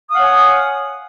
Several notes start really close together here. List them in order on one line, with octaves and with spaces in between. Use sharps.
D#6 F5 F#5 C#5 G#5